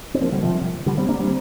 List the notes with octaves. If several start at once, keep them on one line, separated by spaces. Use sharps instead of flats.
C4
F3 A#3
D3 G3
C3 F3
D3 G3
G3 C4
A#3 D4
G3 C4